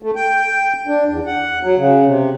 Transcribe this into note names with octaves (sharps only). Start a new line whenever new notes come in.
A3
G5
D4
E2
F#5
F#3
C#3
C3